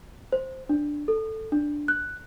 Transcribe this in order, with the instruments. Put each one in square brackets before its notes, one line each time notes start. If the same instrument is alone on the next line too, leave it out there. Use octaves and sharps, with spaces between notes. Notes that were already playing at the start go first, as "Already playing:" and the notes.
[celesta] C5
D4
A4
D4
F#6